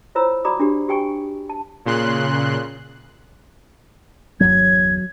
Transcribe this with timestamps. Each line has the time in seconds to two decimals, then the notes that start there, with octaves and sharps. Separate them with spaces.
0.15 E4 F4 C5 C#5 A#5 E6
0.45 F#4 D5 A#5 B5 D6 D#6
0.59 D4 F#4 G4
0.88 F#4 G4 G5 G#5 C#6
1.49 A5
1.86 A#2 C#3 C6 F#6
4.40 G1 E2 F#3 G#6